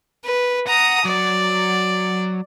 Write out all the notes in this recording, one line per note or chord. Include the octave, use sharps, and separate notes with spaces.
B4
F#5 A#5 D#6
F#3 D5